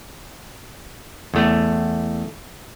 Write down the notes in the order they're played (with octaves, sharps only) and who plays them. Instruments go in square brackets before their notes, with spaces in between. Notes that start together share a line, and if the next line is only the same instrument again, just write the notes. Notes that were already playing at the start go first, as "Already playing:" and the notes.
[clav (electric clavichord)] E2 A3